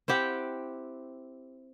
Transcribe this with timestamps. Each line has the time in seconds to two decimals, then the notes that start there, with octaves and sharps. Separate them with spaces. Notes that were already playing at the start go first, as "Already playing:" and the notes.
0.08 C4 E4 G4 F#5